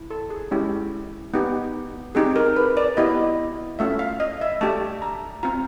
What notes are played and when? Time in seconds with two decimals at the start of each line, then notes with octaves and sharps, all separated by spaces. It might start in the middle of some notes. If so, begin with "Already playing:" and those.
Already playing: E4
0.10 A4
0.30 G#4
0.51 G#3 C#4 E4 G4
1.34 B3 D#4 G4
2.15 C4 D#4 G4 G#4
2.36 A#4
2.56 B4
2.77 D5
2.97 B3 E4 G4 D#5
3.79 A3 C#4 F4 E5
3.99 F5
4.20 D#5
4.41 E5
4.61 A3 D4 G4 A5
5.02 A#5
5.43 C4 F4 A#5